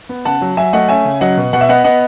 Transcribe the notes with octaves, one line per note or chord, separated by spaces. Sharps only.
B3
C#3 F#5 A5
F#3
F#3 E5 G#5
A3 D#5 F#5
C#4 E5 G#5
C#3
F#3 D#5 F#5
B2
B2 F#5
E5
B3 D#5 F#5
B3 D#5 F#5